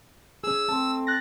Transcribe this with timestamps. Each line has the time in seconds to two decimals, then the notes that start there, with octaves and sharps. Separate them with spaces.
0.44 C#4 G#4 E6
0.68 A3 C4 A5
1.07 F#6 A6 A#6